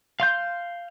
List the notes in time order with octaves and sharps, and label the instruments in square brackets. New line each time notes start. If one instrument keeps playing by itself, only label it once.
[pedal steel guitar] F5 C6 G6